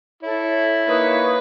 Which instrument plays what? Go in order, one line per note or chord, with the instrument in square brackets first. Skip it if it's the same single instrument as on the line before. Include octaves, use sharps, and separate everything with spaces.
[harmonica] E4 [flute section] A4 [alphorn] C#5
[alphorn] A#3 [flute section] D#4 C#5 F5 [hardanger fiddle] B4